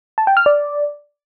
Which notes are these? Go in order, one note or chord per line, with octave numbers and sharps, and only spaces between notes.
A5
G5
F6
D5